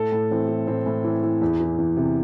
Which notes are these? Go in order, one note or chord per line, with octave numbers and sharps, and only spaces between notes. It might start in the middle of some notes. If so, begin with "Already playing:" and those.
Already playing: A2 A4
A2
E3 C4
E3
A2 C4
A2
E3
E3
E2
E3
E2
C3